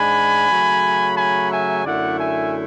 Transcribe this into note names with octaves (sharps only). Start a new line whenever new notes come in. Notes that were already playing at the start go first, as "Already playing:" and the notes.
Already playing: G#2 G#3 D4 G#5 B5
C#3 F#3 A3
G#5 B5
E5 G#5
F#2 D3 A3 E4 D5 F#5
E5 G#5